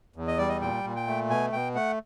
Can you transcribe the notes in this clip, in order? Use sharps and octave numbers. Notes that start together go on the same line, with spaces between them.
E2
D#5
G3 D5
D#5
A#2 G5
A#2
G5
A3
B2 G#5
B2 G5
A3 F#5